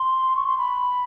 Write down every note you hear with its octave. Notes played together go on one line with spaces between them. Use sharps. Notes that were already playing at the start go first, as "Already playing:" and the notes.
Already playing: C6
C#6
C6
B5